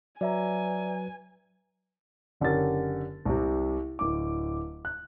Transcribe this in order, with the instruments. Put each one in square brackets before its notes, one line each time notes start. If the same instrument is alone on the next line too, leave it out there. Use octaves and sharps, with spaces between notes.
[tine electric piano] F#3 [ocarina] B4 [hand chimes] D5 E5 A#5 [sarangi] G#5
[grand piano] F#1 D3 C#4 G4 A#4 A6
C2 C3
D1 D6
F#6